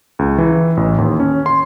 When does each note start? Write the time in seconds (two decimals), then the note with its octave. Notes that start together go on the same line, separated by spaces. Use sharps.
0.19 C#2
0.38 E3
0.77 A1
0.98 D#2
1.20 C#4
1.46 C6